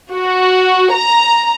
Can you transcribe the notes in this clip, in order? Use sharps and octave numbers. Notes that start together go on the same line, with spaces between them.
F#4
A#5